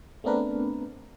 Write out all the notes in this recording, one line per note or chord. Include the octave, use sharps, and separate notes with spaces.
A3 B3 C4 D4 A#4 B4